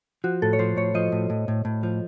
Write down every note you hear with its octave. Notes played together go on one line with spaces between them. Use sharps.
F3 F#4
A2 A4
C#5
F3 C5
A2 C#5
F3 D#5
A2
A2
A2
A2
F3